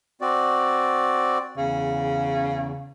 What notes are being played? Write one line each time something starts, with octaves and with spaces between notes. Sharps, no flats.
C4 F#4 D5
E2 C#3